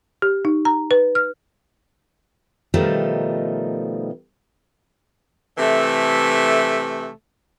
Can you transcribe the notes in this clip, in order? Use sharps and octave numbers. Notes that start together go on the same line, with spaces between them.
G4
D#4
A#5
B4
F6
B2 D#3 F3 G3 A3 D#4
C3 E3 A3